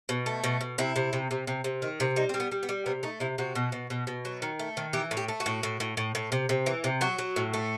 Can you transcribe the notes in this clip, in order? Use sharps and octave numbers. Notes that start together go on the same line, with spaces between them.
B2
A3
B2
B2
C3 E4
C3
C3
C3
C3
C3
D#3
C3
G3 D#4
G3 C4
B3
G3
B3
G3
C3 B3
A3 D#4
C3 E4
C3 F#4
B2
B2
B2
B2
F#3
D#3
A3
D#3
E3 G4
A2
G4
A3
F#4
A2
A2
A2
A2
A2
C3
C3
E3
C3
F#3 F#4
F#3
A2
A3